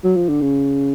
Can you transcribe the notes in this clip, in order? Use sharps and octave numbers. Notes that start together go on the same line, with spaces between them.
F#3
F3
D3
C#3